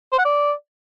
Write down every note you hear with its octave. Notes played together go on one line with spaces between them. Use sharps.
C5
F#5
D5